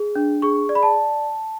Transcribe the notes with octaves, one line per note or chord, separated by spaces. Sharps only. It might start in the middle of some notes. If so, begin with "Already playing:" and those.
Already playing: G#4
D4
G#4 C#6
D5
B5
A5